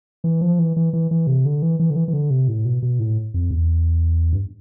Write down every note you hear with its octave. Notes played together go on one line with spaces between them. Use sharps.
E3
F3
E3
E3
E3
E3
C3
D3
E3
E3
D3
E3
E3
D3
C3
A2
B2
B2
A2
F2
E2
G2